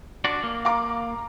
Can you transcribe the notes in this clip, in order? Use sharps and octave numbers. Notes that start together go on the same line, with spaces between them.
D4 F#4 D5 D6
A#3
F5 A#5 D6